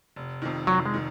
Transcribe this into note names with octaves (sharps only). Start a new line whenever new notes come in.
F1
F2 D#3
F1 F#3
G#3
D#3